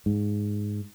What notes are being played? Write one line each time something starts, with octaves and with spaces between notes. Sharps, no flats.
G#2